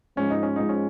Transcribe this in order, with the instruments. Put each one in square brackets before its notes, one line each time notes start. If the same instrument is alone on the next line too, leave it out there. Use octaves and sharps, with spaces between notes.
[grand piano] G#2 F3 G#3 [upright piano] C#4
[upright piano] D#4
C#4
[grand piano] G#2 F3 G#3 [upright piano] D#4
[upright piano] C#4